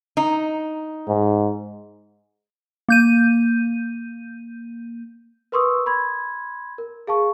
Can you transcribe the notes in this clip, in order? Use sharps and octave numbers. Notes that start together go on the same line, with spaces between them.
D#4
G#2
A#3 G6 D#7
A#4 B4 C6 C#6 D#6 E6
B5 C6 G#6
A#4
G#4 F5 A5 C#6